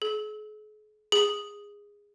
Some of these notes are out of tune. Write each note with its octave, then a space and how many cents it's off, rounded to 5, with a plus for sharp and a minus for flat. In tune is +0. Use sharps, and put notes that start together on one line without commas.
G#4 +45
G#4 -15